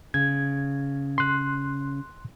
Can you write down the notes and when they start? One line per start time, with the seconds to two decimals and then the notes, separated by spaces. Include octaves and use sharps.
0.14 C#3 G#6
1.18 C6 F#6